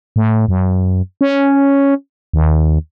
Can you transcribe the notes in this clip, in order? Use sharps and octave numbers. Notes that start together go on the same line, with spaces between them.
A2
F#2
C#4
D#2